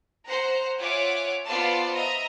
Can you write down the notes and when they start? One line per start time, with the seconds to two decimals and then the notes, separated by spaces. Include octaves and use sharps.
0.25 C5 F#5 A#5
0.79 F4 C#5 E5 F#5 G#5 D6
1.46 B3 F4 C5 D5 F5 A5
1.93 D#5 E5 A#5